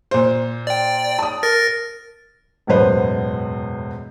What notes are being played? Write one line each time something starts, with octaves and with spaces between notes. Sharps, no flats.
A#2 C5
D5 G5
A5 D#6
A#4 A6 A#6
E1 A1 F#2 B4 C5